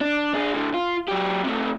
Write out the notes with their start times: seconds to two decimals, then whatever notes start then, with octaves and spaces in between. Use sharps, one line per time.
0.01 D4
0.34 D4 G#4
0.54 A2 D3
0.74 F4
1.08 F#3 G4
1.44 C3 A3